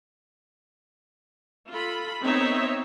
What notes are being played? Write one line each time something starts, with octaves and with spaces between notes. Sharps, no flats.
F4 A4 B5
B3 C4 D#4 C#5 E5